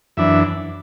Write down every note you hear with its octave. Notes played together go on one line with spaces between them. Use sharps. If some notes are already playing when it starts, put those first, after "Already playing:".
F#2 E3 D4 E5